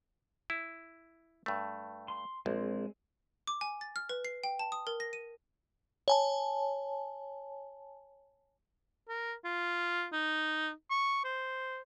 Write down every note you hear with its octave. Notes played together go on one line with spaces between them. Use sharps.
E4
G2 A3
C6
A#1 G#3 C4
D6
G#5
A6
F6
B4
C7
G5
A5
D#6
A#4
A#6
D#7
C#5 G#5 A5
A#4
F4
D#4
C#6
C5